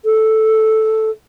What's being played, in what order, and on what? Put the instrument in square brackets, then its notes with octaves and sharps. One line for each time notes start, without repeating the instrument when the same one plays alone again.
[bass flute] A4